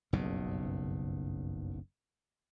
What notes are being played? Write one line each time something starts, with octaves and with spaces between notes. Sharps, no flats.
F#1 B1 G2 C#3